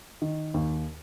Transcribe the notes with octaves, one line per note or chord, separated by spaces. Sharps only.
D#3
D#2